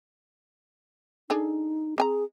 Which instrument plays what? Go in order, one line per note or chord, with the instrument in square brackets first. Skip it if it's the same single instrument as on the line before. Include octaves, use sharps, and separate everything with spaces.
[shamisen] D4 G#4 A4 [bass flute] D#4
[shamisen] C4 G#5 A#5 [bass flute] G#4